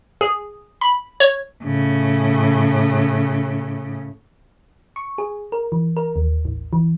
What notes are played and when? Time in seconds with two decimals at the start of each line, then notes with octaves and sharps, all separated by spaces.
0.21 G#4
0.81 B5
1.20 C#5
1.63 A2 C#3
4.96 C#6
5.18 G#4
5.52 A#4
5.72 E3
5.97 A#4
6.16 D#2
6.45 A1
6.73 E3